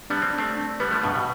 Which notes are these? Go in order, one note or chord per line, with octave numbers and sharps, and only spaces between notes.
G3 B3 D4
C4
D4
A3 C4
D4
G3 B3 B4
F3 A3
G2 B2 D4
B2